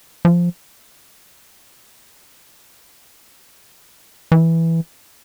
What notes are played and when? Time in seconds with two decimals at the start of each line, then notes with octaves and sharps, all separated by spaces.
0.25 F3
4.32 E3